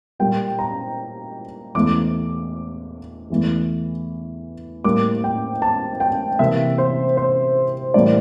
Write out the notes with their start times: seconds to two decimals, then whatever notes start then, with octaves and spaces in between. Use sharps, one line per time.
0.19 A#2 G3 A#3 G5
0.59 A#5
1.75 E2 E3 A3 D6
3.30 E2 E3 A3
4.84 A2 G3 A#3 D6
5.24 G5
5.62 A5
6.00 G5
6.39 C3 E3 A#3 E5
6.78 C5
7.17 C5
7.94 A2 E3 G3 A#3 D5